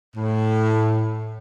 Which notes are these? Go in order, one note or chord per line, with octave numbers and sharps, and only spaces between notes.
A2